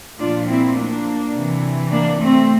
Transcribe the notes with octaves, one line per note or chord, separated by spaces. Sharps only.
A#2 F3 D4 F4
C4 E4
A#3 D4
C3 E3
A#3 D4
A3 C4